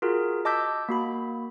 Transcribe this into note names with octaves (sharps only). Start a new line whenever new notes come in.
F4 F#4 G#4 A#4
D#5 A5 D6 E6 G6 B6
A#3 F#4 B5